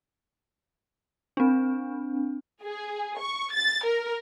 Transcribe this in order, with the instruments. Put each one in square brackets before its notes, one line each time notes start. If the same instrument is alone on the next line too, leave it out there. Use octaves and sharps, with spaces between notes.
[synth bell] C4 D4
[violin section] G#4
C#6
A6
A#4